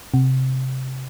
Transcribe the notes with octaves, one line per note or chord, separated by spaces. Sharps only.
C3